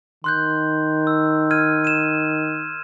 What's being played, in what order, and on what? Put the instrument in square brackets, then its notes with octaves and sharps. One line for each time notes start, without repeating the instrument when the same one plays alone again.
[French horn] D#3 [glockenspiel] C6 F#6 G6
[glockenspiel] E6
F6 G#6 D#7
D#7 E7